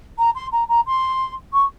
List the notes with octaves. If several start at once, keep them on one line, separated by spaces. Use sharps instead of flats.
A#5
C6
A#5
A#5
C6
C#6